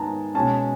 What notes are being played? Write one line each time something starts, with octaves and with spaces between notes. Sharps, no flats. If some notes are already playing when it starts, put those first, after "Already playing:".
Already playing: G#2 D#3 G#3 B3 A5 A#5
B2 G#3 C#4 A5